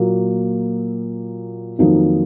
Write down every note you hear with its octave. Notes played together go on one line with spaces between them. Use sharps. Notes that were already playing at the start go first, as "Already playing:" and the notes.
Already playing: A#2 F#3 A#3
F2 D#3 F#3 A#3 D#4